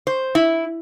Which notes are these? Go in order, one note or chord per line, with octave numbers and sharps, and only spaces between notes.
C5
E4